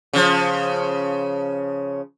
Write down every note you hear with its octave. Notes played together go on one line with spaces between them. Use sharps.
C#3 F3